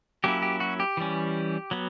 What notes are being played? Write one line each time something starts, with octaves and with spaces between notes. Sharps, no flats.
F#3 A#3 C#4 E4 G4
G4
F#4
G4
E3 G3 C#4
F#3 B3